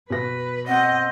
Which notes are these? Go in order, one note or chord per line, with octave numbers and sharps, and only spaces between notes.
B2 B4 A#6
C4 D#5 F#5